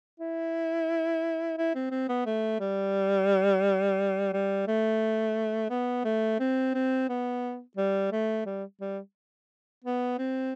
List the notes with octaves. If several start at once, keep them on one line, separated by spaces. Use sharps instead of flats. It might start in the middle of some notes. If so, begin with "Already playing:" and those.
E4
E4
C4
C4
B3
A3
G3
G3
A3
B3
A3
C4
C4
B3
G3
A3
G3
G3
B3
C4